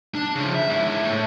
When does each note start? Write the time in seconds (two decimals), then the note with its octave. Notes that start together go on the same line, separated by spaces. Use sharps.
0.15 D4
0.35 C#3 F3
0.55 E5
0.70 G#2 E4
1.04 A2